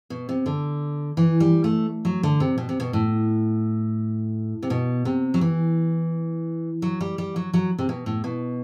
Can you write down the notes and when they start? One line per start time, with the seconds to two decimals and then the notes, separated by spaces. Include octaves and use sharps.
0.10 B2
0.29 C3
0.46 D3
1.17 E3
1.40 G3
1.64 A3
2.05 F#3
2.23 D3
2.40 C3
2.58 B2
2.69 C3
2.80 B2
2.93 A2
4.63 C3
4.70 B2
5.05 C3
5.34 F#3
5.41 E3
6.82 F#3
7.01 G3
7.18 G3
7.36 F#3
7.54 F#3
7.79 C3
7.89 B2
8.06 A2
8.24 B2